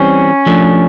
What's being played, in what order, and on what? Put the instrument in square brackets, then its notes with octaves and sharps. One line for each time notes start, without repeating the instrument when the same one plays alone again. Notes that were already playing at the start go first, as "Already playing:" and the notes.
Already playing: [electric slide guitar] E3 G3 C4 [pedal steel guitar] C#4
[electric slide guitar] F3 A3 D4